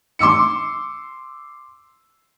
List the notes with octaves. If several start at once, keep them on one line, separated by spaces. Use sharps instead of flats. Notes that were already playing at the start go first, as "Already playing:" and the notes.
C6 D6 E6 C#7